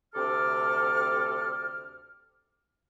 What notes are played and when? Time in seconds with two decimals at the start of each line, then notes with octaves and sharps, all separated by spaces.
0.14 D2 C3 A4 D6 F6